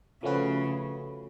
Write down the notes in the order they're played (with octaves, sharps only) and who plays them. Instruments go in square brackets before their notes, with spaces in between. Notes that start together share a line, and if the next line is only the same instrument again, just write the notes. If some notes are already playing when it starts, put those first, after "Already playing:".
[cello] C#3 [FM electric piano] F3 A3 C#4 F#4 B4